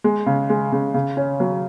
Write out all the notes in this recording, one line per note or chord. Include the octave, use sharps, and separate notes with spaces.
G#3
C#3
G#3
C#3
C#3
C#4
F#3